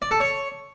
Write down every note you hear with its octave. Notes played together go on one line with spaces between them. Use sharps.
D5
A4
C#5